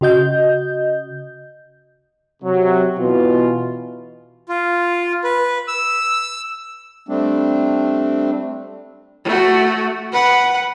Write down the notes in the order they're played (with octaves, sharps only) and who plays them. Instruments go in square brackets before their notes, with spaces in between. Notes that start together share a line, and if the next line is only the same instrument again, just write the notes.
[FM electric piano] C#3 F#4 D#5 G6
[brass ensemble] C3 F#3
B2 E3 F4
[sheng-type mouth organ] F4
B4
E6
[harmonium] G3 A3 C4 D4
[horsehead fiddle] A3 F#4
B4 F#5